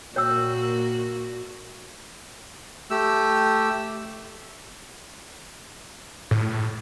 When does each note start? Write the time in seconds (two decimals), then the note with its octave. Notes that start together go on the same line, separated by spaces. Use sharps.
0.16 A#2 A#3 F#4 C#5 G5 E6
2.90 A3 G4 E6
6.31 A2